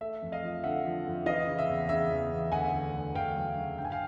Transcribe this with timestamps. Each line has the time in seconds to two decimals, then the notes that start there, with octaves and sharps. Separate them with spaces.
0.01 A3 E5
0.22 F2
0.32 D#5 F5
0.43 F3
0.64 D3 E5 F#5
0.85 F3
1.06 F2
1.26 E3 D#5 F5
1.47 C#3
1.59 E5
1.68 E2
1.89 C#3 E5
2.11 E2
2.31 E2
2.52 D2 F#5 G#5
2.73 D2
2.94 D2
3.15 D2 F5 G5
3.36 F#3
3.57 C#3
3.78 G2 G5
3.85 G#5
3.92 F5 G5